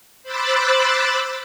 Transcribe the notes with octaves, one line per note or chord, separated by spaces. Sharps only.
C5 B5 D6 E6 F#6 A6